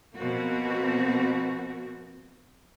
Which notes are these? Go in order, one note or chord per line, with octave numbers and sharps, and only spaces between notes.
B2 F3 A#3 C4 F#4